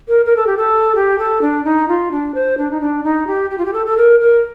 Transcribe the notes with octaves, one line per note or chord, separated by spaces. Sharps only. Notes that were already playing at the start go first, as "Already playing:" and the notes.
A#4
A#4
A4
G4
A4
G4
A4
D4
D#4
F4
D4
C5
D4
D#4
D4
D#4
G4
G4
F4
G4
A4
A4
A#4
A#4